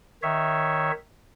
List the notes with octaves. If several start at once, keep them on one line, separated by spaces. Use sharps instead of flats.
D#3 C#5 E5